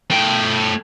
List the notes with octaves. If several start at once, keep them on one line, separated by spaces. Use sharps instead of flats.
A3 G5